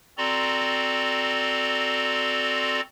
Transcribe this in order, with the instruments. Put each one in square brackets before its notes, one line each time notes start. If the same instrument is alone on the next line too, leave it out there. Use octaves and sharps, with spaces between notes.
[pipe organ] C4 F#4 A4 D5 A#5 C6